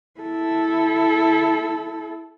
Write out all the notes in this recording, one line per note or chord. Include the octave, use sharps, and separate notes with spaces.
E4 A4